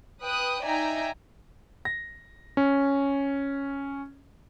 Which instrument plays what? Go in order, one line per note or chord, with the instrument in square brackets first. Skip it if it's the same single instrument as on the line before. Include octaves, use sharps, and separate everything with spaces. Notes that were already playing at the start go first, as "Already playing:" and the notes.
[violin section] B4 G5 D#6 F#6
D#4 D5 E5 G5 G#5 A#5
[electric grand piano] A#6
C#4